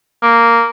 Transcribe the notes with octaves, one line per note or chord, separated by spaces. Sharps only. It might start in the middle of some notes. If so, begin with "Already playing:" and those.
A#3